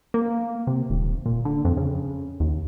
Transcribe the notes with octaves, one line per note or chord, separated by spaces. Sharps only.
A#3
C3
D#1
A#2
D3
F2
C#3
D#2